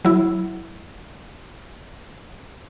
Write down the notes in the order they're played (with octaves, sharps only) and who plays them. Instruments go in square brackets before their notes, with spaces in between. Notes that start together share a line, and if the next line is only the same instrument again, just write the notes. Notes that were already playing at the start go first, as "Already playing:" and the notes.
[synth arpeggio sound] F#3 E4